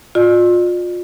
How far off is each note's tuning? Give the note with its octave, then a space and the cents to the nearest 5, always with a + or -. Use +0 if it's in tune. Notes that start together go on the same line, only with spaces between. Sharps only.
F4 +30 D5 +40